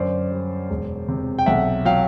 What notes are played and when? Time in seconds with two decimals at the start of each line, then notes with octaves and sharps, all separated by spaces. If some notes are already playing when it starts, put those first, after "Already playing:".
Already playing: F#2 D3 C5 D5
0.31 G3
0.70 E1
1.08 C3
1.39 G5
1.46 B1 E5 F#5
1.85 F#3 F5 G5